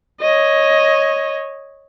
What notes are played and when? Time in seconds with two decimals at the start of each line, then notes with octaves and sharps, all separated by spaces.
0.21 C#5 D#5